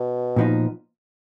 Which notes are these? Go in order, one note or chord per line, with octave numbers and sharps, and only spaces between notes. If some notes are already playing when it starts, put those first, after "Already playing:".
Already playing: B2
A#2 F3 B3 D#4